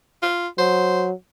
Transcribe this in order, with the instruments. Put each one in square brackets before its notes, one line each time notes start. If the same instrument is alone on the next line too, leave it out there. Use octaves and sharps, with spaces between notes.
[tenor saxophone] F4
[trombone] F#3 [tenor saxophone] C5